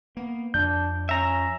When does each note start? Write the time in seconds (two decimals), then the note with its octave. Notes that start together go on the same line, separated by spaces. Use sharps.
0.17 A#3 B3
0.54 F2 D4 G6
1.09 C#4 E5 A#5